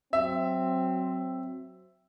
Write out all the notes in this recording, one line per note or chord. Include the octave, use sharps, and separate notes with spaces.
F#3 C4 E5